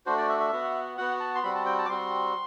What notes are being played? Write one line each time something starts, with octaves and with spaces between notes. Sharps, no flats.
A3 D4 F#4 C5
D5
E5
E5
B3 F#4
B3 F#4 F#5
A5
C6
G3 C4 F#4 B5
A5
G5
A5
D6
G3 C4 F#4 C6